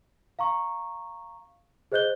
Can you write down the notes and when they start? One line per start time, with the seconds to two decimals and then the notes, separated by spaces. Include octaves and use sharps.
0.39 F5 A#5 C#6
1.92 G#4 C5 D#5 F#6 G6 G7